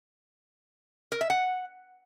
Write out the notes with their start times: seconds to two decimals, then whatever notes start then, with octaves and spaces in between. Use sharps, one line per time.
1.12 A#4
1.21 E5
1.30 F#5